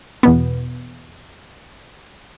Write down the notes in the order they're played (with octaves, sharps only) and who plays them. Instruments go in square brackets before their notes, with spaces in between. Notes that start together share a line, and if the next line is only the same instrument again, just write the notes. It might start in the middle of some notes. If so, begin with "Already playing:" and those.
[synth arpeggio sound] E2 B2 B3